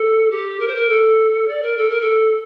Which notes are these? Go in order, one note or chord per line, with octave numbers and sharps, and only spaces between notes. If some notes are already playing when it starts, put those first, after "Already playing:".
Already playing: A4
G4
A#4
C5
A#4
A4
D5
A#4
A4
A#4
A4